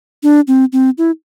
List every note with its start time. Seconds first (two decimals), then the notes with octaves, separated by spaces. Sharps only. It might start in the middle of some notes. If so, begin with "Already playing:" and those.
0.23 D4
0.48 C4
0.73 C4
0.98 E4